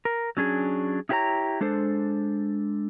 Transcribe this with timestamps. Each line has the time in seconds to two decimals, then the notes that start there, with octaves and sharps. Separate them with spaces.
0.05 A#4
0.37 F#3 C#4 D4 G#4
1.09 D#4 E4 G4 B4 C#5 A#5
1.61 G#3 D4 A4 C5